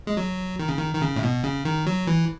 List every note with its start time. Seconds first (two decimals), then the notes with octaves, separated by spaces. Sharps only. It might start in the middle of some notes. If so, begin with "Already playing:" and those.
0.07 G#3
0.17 F#3
0.59 D#3
0.68 C#3
0.77 D#3
0.95 D#3
1.02 C#3
1.16 A2
1.23 B2
1.43 C#3
1.65 D#3
1.86 F#3
2.07 E3